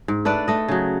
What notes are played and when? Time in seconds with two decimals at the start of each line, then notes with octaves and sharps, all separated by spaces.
0.08 G#2
0.25 A3 D4 B4 D5
0.48 A3 D#5
0.68 C#3 F#3